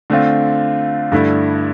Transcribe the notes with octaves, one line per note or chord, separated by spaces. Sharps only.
D3 A3 C4 F4
G2 D3 A3 E4